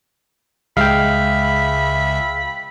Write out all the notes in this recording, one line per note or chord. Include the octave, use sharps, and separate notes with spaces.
C#2 G#3 E5 F5 G5 B5